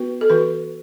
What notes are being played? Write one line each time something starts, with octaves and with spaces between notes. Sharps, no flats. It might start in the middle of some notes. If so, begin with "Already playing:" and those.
Already playing: B3 F#4 B4
A4
E3 F#4 B4